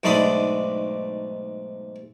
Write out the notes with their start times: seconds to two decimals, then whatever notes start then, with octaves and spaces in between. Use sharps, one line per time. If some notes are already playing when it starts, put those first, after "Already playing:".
0.03 B1 G#2 A3 D4 B5 D#6